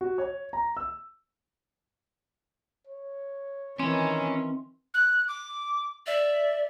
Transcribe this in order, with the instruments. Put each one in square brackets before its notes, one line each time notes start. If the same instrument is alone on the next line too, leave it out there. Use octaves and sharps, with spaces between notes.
[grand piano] F#4
C#5
A#5
E6
[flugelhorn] C#5
[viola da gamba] D#3 E3 [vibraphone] C4 [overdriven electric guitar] C#4
[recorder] F#6
D6
[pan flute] D5 [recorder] E5